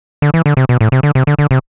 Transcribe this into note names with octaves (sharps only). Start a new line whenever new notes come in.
D3
E3
D3
C3
B2
A2
C3
D3
C3
D3
D3
C3